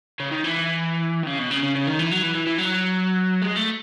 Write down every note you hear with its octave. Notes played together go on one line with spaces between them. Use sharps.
C#3
D#3
E3
D#3
C#3
B2
C#3
C#3
C#3
D#3
E3
F#3
E3
E3
E3
F#3
G#3
A3